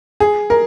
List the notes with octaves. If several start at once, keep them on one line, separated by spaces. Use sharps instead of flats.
G#4
A#4